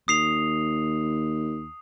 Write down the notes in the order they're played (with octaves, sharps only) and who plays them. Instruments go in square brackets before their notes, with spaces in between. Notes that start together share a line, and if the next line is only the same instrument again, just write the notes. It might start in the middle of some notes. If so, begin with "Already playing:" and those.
[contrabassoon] D#2 [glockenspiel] D#6 C7 F7